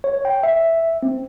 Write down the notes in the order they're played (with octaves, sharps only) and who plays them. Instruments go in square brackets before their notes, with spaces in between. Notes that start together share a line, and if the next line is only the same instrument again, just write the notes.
[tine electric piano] C#5
G5
E5
C4